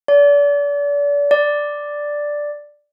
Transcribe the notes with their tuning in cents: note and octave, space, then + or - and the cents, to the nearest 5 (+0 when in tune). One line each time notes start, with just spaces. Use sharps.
D5 -35
D5 +0